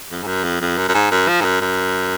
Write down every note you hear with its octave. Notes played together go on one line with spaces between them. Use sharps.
F2
G#2
F#2
F2
F2
F#2
F#2
G#2
F#2
F3
G#2
F#2
F#2